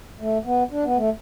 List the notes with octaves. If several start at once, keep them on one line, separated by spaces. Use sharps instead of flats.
A3
B3
D4
B3
A3